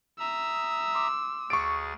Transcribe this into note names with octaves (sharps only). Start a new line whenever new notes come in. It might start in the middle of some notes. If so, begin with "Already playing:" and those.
E5 A#5 D#6 E6
C6 D6
D2 G#4 C#6 A6 D7